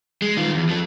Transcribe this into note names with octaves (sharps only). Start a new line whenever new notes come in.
G#3
D#3 F4
E2
F3 A4